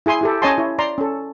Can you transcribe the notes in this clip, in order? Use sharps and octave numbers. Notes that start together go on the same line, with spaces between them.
E4 G#4 G#5 C6
E4 G4 A4
C#4 C#5 D#5 G#5 A5 C6
E4 C#5
D5 A#5 C6
C#4 A4